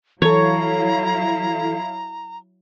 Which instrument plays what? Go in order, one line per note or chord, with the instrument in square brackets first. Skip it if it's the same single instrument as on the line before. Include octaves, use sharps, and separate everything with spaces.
[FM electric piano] E3 A4 [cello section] F#3 E4 F5 [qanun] C#5 [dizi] A#5